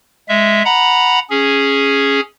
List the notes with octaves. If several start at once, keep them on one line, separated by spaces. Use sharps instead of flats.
G#3 E5
F#5 A#5 B5
C#4 G#4